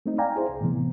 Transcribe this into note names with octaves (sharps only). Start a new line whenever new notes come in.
A3 C4 D#4
D5 F5 G5 G#5 A#5
E4 G#4 C5
C2
A2 C3 E3 B3